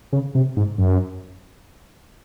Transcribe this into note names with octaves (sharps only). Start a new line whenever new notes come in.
C#3
C3
G#2
F#2